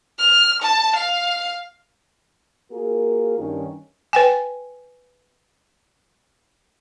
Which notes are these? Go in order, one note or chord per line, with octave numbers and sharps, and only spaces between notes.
F6
A5
F5
A#3 F4 F#4 G#4 A#4
G2 D#3 C#4
B4 G5 G#5